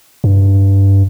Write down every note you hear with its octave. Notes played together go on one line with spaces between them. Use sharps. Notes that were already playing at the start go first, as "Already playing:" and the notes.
G2